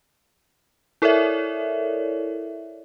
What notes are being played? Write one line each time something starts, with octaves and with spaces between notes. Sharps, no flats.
E4 A4 A#4 C#5 D5 E5